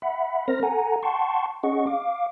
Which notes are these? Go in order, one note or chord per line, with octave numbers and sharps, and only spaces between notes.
E5 F#5 B5
C4 A#4 C5 F6 A#6
A4 F#5 G#5 A#5
F#5 G5 A5 C6 C#6
C#4 G#4 D#5 F#5 C#6
F5 D6